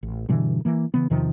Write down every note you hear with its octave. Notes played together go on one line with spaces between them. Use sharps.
A1
G2 B2 D3 E3
E3 A#3
C#3 E3 B3
E2 C3 D#3 F3